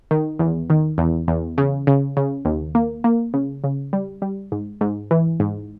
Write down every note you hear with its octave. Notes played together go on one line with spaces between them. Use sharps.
D#3
E2
D#3
E2
E2
C#3
C#3
C#3
D#2
A#3
A#3
C#3
C#3
G3
G3
G#2
G#2
E3
G#2